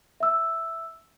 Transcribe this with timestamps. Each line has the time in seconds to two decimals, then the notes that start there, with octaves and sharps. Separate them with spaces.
0.20 E5 E6